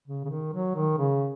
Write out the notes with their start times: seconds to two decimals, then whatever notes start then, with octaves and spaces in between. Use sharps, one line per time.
0.07 C#3
0.25 C#3
0.30 D#3
0.53 F#3
0.75 D#3
0.98 C#3